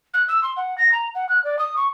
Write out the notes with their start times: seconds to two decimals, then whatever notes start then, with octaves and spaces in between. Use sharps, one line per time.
0.13 F#6
0.28 E6
0.43 C6
0.56 F#5
0.77 A#6
0.92 A#5
1.14 F#5
1.29 F#6
1.44 D5
1.58 D#6
1.76 C#6